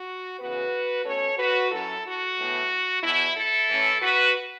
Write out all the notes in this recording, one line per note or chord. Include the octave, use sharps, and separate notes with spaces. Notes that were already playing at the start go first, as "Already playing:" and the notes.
Already playing: F#4
C#3 E3 B3 F#4 B4
B2 A3 C#4 A4 C#5
F#4 B4
F#2 F#3 C#4 E4 A4
F#4
A2 E3 B3
E2 B2 B3 E4
E4 A4
A2 E3 A3 C#4
F#4 B4